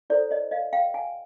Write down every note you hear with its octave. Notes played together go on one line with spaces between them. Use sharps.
E4 A4 C5 D5
C#5 D#5
D#5 F5
F5 G5
F#5 G#5